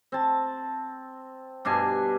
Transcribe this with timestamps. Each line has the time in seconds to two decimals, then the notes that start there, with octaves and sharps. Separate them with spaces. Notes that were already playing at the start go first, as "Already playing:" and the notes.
0.12 C4 A5
1.65 G2 B2 D4 G#5